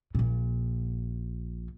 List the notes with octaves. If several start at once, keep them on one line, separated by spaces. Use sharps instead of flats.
A#1 A#2